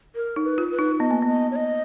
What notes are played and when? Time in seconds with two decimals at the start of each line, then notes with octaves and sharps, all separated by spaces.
0.16 A#4
0.36 D#4
0.44 B4
0.58 F4
0.72 B4
0.79 D#4
1.00 B3 D#5
1.11 A#3
1.22 B3
1.28 D#5
1.51 C#5
1.56 D#5